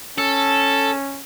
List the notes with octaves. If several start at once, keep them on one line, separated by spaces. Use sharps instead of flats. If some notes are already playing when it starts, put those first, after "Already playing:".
C#4 A4